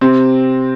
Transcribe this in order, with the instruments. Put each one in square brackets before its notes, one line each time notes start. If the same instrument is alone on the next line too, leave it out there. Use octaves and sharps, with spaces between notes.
[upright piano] C3 C4